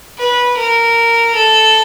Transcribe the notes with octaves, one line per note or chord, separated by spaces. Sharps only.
B4
A#4
A4